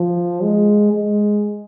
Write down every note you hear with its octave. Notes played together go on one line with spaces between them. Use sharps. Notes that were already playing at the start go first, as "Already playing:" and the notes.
Already playing: F3
G#3
G#3